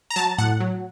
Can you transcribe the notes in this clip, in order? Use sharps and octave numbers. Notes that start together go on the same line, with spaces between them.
A#5
F#3 A5
A2 F#5
F#3